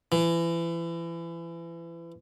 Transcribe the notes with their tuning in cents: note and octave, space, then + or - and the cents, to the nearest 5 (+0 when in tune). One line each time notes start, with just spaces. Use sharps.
E3 +30